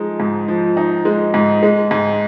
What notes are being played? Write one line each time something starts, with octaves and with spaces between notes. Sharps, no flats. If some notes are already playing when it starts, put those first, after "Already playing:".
Already playing: F3 G#3 D#4
G#2
F3
D#4
G#3
G#2
G#3
G#2